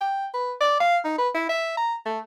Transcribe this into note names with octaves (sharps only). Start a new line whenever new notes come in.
G5
B4
D5
F5
D#4
B4
E4
E5
A#5
A3